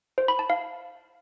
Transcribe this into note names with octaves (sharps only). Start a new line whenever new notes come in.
C5
B5
A5
F5